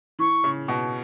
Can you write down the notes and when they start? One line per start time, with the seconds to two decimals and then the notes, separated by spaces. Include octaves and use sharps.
0.19 E3 C#6
0.44 C#3
0.68 B2